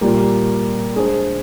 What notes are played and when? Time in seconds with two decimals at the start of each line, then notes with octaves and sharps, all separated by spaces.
0.01 A#2 G3 A#3
0.95 G#3 D4 G#4 C5